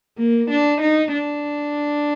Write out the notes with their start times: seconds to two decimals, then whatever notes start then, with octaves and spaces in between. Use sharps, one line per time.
0.18 A#3
0.50 D4
0.81 D#4
1.12 D4